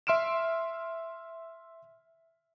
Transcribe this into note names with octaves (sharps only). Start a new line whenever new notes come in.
E5 C6 F6 D7 E7